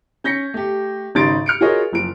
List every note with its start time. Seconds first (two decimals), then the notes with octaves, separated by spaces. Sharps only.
0.24 C#4 G6 A#6 B6 C#7
0.54 A3 G4
1.15 G#1 C#3 D#4 C6 A6 D7
1.46 F6 C#7 D7
1.61 F4 F#4 G#4 A#4 C#5 D#5
1.92 F#1 F3 D7